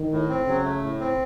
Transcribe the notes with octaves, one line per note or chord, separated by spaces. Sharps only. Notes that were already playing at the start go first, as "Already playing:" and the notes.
Already playing: D#3
A2
C4
C#3 F#3
A3
A2
C4